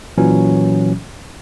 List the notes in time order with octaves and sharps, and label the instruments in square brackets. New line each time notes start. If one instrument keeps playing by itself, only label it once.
[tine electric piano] A#2 E3 F#3 C#4